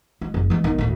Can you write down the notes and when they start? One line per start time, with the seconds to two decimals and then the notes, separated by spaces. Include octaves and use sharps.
0.21 G#3
0.34 F#1
0.50 E3 G#3
0.64 B1 D#3
0.78 D2 A2